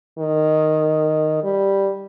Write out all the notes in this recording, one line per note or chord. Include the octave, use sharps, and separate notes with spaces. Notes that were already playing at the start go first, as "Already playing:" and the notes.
D#3
G3